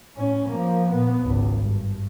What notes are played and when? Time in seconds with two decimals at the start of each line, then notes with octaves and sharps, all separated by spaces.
0.15 A2 C#4
0.50 F3 A#3
0.90 A#2 B3
1.22 G#1 C#2
1.60 G2